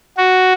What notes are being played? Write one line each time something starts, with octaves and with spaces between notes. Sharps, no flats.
F#4